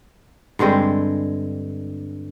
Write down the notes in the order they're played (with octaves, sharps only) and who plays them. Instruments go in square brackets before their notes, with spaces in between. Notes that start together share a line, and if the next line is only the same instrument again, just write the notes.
[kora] G2 D3 G#3 C4